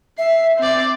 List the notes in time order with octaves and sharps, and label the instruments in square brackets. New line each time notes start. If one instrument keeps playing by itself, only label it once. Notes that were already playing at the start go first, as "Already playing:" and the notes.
[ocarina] E5 [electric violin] C7
[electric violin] C4 D5